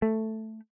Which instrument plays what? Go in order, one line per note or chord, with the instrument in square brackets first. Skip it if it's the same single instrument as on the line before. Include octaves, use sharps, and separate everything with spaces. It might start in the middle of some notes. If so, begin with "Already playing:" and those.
[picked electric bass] A3